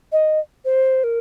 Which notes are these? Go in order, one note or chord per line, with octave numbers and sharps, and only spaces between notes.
D#5
C5
A#4